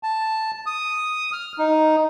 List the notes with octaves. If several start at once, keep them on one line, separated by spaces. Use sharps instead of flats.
A5
D#6
F6
D#4